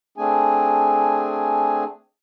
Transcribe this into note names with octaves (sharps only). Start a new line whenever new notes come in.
A3 C4 D4 G#4 G#5